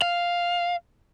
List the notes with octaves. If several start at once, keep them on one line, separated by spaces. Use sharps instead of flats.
F5